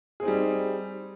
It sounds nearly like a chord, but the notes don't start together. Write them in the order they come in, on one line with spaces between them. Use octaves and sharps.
G#4 C4 D#4 G3